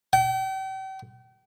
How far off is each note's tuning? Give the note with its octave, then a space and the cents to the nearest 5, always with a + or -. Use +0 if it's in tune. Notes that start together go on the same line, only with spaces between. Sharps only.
G5 -40